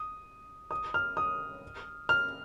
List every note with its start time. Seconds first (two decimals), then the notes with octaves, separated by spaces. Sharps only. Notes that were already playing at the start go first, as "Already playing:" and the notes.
Already playing: D#6
0.71 D#6
0.94 F6
1.17 D#6
2.09 F6